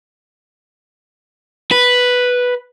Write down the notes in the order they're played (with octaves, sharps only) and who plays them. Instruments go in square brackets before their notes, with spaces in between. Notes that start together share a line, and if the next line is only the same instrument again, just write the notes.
[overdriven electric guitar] B4